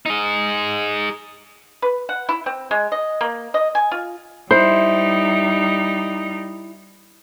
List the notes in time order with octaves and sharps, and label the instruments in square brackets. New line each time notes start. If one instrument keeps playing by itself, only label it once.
[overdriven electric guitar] D#4 G#4
[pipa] B4
F#5
E4
C4
G#3
D#5
A#3
D#5
G#5
F4
[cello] G3 D#4 [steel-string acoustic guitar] E4 [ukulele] C5